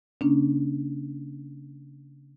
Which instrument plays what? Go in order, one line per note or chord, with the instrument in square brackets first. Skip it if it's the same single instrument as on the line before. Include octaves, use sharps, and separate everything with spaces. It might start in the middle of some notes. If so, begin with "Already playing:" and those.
[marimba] C#3 A#3 C#4 D4